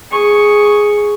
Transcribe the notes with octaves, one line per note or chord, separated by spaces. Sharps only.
G#4 C#6